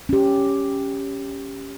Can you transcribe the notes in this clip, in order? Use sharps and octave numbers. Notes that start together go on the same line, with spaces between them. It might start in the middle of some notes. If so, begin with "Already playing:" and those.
C#4 G4